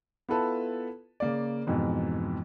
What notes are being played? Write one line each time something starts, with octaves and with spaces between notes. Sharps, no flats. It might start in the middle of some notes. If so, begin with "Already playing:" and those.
B3 E4 F4 A4 B4 A5
C#3 A#3 D5
F2 G#2 B2 E3